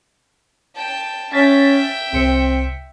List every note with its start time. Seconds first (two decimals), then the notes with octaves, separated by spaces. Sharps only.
0.75 G5 A5
1.33 C#4 E5 G5 A6 B6
2.13 C2 C4 C#7